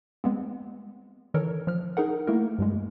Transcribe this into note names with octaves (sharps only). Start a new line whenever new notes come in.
G#3 B3 C4
D#3 E3 A4 A#4 C#5
F3 F6
D#4 G#4 A#4 F#5
A3 A#3 E4 A#4
G2 G3 G#3